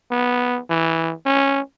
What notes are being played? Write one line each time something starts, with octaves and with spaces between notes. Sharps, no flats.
B3
E3
C#4